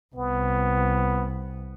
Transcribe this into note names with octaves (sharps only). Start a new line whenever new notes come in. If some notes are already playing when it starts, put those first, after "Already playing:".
C2 B3